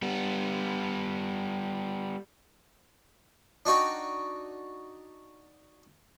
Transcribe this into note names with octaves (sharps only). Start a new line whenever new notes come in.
G3 B3
D4 D#4 F#4 G5